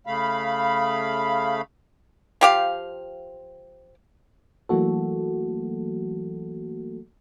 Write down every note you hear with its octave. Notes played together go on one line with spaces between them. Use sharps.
C#3 A3 F5 B5
F3 G4 F5
E3 F#3 A3 A#3 F#4 A4